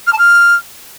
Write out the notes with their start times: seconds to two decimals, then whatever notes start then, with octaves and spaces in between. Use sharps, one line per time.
0.06 F6
0.12 A5
0.18 F6